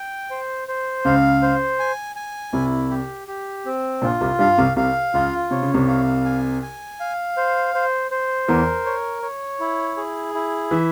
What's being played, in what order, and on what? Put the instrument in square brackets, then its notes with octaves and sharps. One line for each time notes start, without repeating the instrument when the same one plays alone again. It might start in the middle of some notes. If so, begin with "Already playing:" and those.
Already playing: [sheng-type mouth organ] G5
C5
C5
[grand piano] C#2 C#3 [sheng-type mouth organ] F5
[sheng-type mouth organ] C5
G#5
G#5
[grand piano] C2 C3 [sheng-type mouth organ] E4
[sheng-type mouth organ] G4
G4
C4
[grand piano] A#1 A#2 [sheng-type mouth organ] F4
[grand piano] C2 C3
[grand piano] G2 G3 [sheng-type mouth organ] F5
[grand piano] C2 C3
[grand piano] C2 C3 [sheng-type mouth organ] F5
[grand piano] C#2 C#3 [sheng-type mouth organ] F4
[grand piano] C3 [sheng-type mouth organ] C#5
[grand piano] C#3
C2 C3
[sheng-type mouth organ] F5
G#5
G#5
F5
C5
C5
C5
[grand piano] E2 E3 [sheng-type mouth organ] A#4
[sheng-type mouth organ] C#5
C#5
E4
G#4
E4
[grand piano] E3 [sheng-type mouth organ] E5